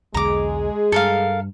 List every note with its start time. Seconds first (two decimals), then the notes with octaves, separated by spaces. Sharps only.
0.14 B1 E2 D3 G#3 G#4 A#5 D6
0.92 G2 A4 A#4 F5